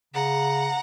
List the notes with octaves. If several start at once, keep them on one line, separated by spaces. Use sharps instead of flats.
C#3 F#5 A#5